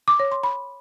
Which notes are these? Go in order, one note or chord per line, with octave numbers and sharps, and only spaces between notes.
D6
C#5
C6
B5